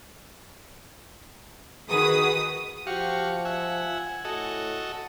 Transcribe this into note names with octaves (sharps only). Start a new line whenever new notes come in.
D#3 F#4 G#4 B4 D#6
F3 F#4 G4 F5 C#6
E5 F#5 G#5
A2 F#4 A4 D#5